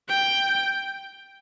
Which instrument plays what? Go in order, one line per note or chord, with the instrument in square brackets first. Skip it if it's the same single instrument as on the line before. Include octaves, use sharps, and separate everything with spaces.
[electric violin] G5